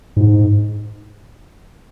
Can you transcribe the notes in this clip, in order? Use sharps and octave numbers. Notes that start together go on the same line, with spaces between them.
G#2